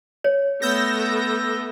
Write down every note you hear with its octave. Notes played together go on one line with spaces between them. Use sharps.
C#5
A3 B3 E6 G6 A#6